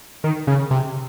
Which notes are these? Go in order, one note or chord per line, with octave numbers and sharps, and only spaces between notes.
D#3
C#3
C3